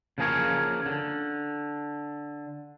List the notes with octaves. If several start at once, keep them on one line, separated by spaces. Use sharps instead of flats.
C#3 F3 A#3 G#4 A#4 C#5
D3